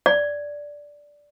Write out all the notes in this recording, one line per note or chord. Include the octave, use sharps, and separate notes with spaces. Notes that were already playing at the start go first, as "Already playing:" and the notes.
D5